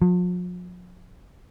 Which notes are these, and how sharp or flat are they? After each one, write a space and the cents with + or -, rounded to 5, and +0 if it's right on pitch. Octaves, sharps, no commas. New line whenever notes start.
F3 +45